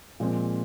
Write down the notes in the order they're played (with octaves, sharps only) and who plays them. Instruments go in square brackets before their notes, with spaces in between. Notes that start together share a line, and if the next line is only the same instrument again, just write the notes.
[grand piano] A#2 F3 G#3 C4 F4